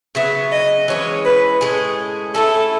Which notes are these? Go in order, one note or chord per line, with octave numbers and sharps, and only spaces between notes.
C#3 F#3 B3 E5
D#5
E3 G#3 C#4 C#5
B4
A2 G#3 C#4 G#4
A3 C#4 E4 A4